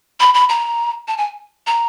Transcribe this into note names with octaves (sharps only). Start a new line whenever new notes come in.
B5
B5
A#5
A5
G#5
A#5